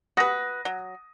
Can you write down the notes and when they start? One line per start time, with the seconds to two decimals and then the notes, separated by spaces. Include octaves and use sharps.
0.17 F#4 B4 D#6 A#6
0.65 F#3